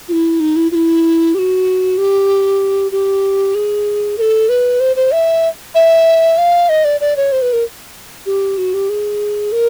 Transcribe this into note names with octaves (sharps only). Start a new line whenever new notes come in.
F4
E4
D#4
E4
F4
E4
G4
F#4
G4
G4
G#4
A#4
A4
B4
C5
C5
E5
E5
F5
D#5
D5
D5
C#5
C5
B4
A#4
G4
F#4
G4
G#4
A#4